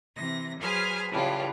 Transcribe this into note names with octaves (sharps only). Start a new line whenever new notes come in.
C3 E3 A#6
F#3 G#4 B4 C5 G#5 F6
A2 C#3 E3 G3 F4